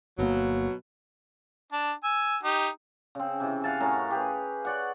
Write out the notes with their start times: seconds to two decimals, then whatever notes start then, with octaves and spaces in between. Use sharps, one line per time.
0.18 G1 B2 F#3 A#3
1.73 D4 A5
2.04 G#5 E6
2.43 D#4 G4
3.15 C#3 C4
3.40 C3 E3
3.64 F5 F#5 G#5 A5
3.81 A2 C#4 A#4 A5
4.11 G4 G#4 B4
4.65 C#5 D5 F#5